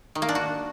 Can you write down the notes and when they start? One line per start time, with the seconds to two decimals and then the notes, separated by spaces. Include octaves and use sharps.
0.15 D#3
0.22 A#3
0.29 D4
0.35 F#4